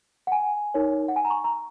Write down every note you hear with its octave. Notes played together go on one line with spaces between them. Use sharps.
F#5
G#5
D#4 A#4 C#5
F#5
G#5
A#5
C#6
A#5